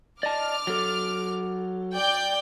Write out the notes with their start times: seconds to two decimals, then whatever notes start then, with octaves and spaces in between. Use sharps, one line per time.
0.23 D5 D#5 A5 D6 F6
0.67 F#3 A4
1.94 D5 G5 G6